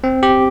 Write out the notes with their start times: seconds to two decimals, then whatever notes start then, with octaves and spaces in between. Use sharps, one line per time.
0.04 C4
0.23 G4